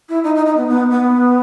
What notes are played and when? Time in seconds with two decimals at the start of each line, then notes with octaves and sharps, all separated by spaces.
0.09 E4
0.24 D#4
0.35 D#4
0.46 D#4
0.57 B3
0.68 B3
0.90 B3